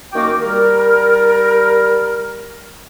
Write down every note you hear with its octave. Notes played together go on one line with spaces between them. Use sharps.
F#2 D#3 A#3 F#4 G5 D6
G3 A#4